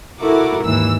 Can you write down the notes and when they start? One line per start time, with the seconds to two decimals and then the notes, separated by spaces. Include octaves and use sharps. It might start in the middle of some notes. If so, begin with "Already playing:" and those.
0.20 E4 F#4 A4 A#4 D6
0.64 G#1 D#2 E3 E6